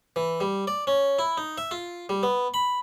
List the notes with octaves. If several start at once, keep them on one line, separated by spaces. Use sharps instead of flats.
E3
G3
D5
C#4
E4
D#4
E5
F4
G3
B3
B5